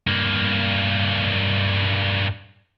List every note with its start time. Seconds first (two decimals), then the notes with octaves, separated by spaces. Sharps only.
0.07 G2 A#3